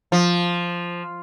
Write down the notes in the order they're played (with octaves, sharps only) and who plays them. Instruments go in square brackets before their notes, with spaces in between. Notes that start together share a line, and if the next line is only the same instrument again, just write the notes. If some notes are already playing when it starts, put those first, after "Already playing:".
[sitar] F3